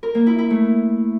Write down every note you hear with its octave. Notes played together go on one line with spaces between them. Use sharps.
A#4
A#3
E4
E4
A3